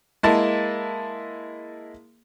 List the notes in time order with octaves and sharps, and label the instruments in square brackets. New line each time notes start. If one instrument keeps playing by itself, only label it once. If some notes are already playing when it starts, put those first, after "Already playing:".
[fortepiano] G#3 A#3 E4 A5